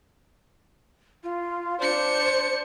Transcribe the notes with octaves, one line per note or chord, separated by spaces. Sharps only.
F4
D4 C5 C#7